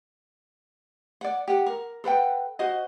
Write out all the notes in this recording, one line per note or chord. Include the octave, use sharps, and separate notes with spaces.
D5 F#5
G4 F#5
A#4
A4 B4 F#5 G5
F#4 C5 D#5